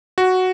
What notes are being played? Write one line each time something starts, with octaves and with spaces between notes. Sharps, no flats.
F#4